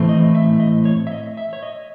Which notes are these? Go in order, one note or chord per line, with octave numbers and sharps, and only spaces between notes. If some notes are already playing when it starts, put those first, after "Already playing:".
Already playing: A2 E3 A3 C4
D#5
E5
D#5
C#5
E5
D#5
E5
C#5
D#5